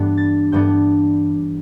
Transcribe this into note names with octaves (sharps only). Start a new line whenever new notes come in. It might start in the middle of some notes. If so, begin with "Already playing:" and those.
Already playing: G2 E3 B3 D4
A6
G2 E3 B3 D4 G6